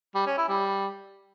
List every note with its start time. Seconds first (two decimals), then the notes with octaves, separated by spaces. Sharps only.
0.15 G3
0.26 C#4
0.38 E4
0.49 G3